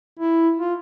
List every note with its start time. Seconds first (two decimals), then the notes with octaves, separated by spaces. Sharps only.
0.20 E4
0.60 F4